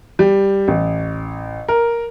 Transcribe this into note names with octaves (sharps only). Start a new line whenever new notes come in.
G3
A1
A#4